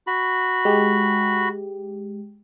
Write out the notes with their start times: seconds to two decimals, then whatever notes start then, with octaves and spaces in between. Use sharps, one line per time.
0.07 F#4 B5
0.65 G#3 G4